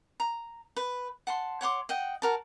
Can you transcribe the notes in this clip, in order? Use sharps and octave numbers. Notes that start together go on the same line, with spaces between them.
A#5
B4
F#5 A5 C6
C#5 F#5 C6 D6
D#5 F#5 G5
F#4 A#4 A5